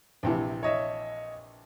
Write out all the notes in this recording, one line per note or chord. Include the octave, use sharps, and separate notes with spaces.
A#1 C3 E3
C#5 D#5 E5